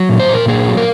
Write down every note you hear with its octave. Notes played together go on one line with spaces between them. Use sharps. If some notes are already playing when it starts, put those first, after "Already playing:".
Already playing: F#3
A#2
C5
A#2 A#4
A#3 G#4
F#3
A#4